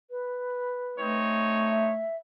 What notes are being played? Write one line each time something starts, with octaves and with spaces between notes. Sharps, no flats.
B4
A3 C4 D#4 C#5
E5